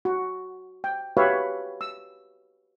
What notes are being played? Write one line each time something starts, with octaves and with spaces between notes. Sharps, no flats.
F#4
G5
F#4 G4 B4 C#5 E5 F5
E6